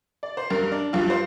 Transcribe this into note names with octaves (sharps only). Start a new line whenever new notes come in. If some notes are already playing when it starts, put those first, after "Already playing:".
D5
C5
G2 G3 A#4
D4
G2 G3 F4
C5